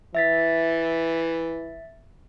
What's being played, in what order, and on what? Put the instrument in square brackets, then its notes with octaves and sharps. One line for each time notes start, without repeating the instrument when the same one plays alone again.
[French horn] E3 [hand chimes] E5 A6 B6